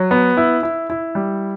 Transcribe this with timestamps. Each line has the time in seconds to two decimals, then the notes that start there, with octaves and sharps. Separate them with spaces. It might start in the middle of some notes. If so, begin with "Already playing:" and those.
Already playing: F#3
0.11 B3
0.37 E4
0.63 E4
0.90 E4
1.15 G3